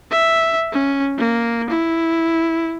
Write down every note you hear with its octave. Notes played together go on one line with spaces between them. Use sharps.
E5
C#4
A#3
E4